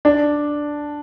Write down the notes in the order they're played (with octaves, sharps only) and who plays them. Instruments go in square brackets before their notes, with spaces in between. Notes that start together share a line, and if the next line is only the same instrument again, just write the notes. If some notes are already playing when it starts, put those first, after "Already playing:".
[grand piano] D4